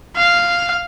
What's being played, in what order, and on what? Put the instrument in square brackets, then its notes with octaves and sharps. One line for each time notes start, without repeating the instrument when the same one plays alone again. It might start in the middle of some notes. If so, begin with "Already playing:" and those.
[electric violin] F5